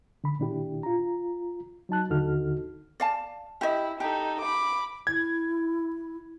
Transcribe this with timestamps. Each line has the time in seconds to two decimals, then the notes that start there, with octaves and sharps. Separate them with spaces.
0.24 D3 B5
0.39 A#2 D#3 D4 E4 G4
0.83 F4 A#5
1.89 F#3 D#4 A5 F#6
2.10 D#2 D3 D#4 F#4 A4 F6
3.00 D5 F5 A5
3.61 E4 G4 D#5
4.00 D#4 G4 A4
4.41 B5 D6
5.07 E4 G#6